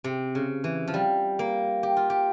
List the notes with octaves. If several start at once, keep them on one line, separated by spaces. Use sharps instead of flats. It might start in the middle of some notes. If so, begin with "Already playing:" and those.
C3
C#3
E3
F3
G3
A#3
G4
F4
G4